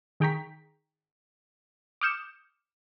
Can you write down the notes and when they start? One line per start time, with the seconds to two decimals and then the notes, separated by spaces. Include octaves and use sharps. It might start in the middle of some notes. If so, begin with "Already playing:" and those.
0.20 D#3 G#4 G5 A#5 C#6 B6
2.01 D6 D#6 F6 G6 C#7 E7